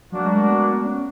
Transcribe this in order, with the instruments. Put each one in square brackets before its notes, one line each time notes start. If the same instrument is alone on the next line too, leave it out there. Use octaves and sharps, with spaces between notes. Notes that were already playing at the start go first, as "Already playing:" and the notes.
[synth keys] F#3 [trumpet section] A#3 D4 F#4
[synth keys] G#3
A3
B3
C#4